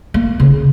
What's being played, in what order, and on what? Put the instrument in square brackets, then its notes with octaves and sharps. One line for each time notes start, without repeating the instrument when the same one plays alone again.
[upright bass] A#3
C#3